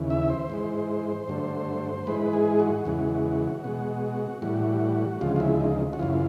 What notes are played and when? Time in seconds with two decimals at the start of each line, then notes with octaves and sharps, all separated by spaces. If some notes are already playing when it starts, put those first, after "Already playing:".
Already playing: D#2 C#3 E3
0.10 E5
0.30 C5
0.50 G#2 E3 G#3
1.28 G2 D3 F#3 A3
2.07 G#2 E3 G#3 B4
2.33 G#4
2.60 F#4
2.85 E2 C#3 E3 G#3
3.64 B2 G#3
4.42 A2 E3 G3 F#4
5.21 D2 C#3 F3 G#3 F4
5.36 F4
5.40 E4
5.61 D#4
5.93 F#4
5.99 F#2 C#3 E3 F4